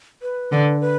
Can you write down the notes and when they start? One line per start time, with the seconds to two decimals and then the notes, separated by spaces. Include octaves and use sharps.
0.22 B4
0.52 D3
0.81 B4